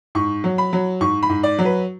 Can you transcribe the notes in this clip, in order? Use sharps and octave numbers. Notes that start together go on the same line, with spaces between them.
G#2 C#6
F#3
B5
F#3
G#2 C#6
B5
G#2
D5
F#3
B4